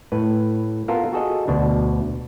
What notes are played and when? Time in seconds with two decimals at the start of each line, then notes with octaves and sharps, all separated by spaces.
0.12 A2 B4
0.88 B3 F4 A4 A#4
1.13 F#4 G#4 A4 D#5
1.48 D2 B2 D4